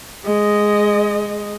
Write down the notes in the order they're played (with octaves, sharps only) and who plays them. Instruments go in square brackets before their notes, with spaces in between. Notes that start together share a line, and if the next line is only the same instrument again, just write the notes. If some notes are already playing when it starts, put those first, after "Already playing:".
[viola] G#3 D#5